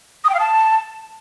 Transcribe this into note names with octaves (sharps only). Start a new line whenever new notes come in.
D#6
G5
F5
A5